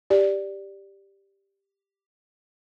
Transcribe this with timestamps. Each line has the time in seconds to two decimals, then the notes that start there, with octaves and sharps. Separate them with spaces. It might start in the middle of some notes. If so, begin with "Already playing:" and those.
0.10 G4 D5